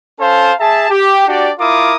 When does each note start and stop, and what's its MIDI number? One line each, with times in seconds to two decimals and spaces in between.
0.20 0.53 61
0.20 0.53 69
0.20 0.53 72
0.20 0.53 77
0.20 0.53 81
0.60 0.90 68
0.60 0.90 76
0.60 0.90 81
0.90 1.25 67
1.27 1.51 62
1.27 1.51 66
1.27 1.51 67
1.27 1.51 74
1.59 1.96 64
1.59 1.96 65
1.59 1.96 70
1.59 1.96 86
1.59 1.96 87